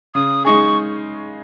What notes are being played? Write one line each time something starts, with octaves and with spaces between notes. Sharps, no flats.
C#3 D#6
G#3 D#4 G#4 C#6